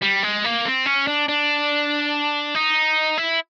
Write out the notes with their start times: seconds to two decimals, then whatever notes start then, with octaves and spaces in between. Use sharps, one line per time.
0.02 G3
0.23 G#3
0.44 A#3
0.65 C4
0.86 C#4
1.07 D4
1.28 D4
2.55 D#4
3.18 E4